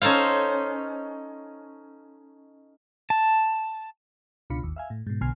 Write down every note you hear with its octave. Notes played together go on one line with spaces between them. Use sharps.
C#4 D#4 A4 C5 F5
A5
C#2 B2 D4 F4 B5 C#7
G#1 D#2
E5 F5 G#5
A2
G#2 B2
B1 B2 D3 G#5 F6 C7